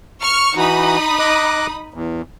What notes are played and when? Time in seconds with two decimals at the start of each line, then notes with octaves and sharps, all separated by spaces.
0.22 C#6 F6 C#7
0.57 E3 D#4 F#4 B5 D#6
1.19 D#5 D6 F#6
1.94 E2